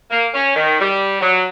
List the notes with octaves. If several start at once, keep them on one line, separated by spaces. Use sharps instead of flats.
A#3
C#4
D#3
G3
F#3